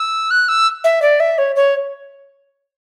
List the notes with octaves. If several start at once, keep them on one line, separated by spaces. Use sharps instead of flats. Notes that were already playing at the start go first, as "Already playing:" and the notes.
Already playing: E6
F#6
E6
E5
D5
E5
C#5
C#5